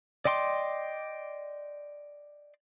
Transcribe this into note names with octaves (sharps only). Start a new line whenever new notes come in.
D5 D#5 G5 C6 D6